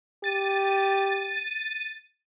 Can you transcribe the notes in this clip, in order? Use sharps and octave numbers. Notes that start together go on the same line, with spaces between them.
G4 A6 D#7